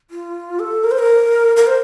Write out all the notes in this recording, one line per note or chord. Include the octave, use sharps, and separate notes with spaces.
F4
A4
A#4
C5
A#4
A#4
C5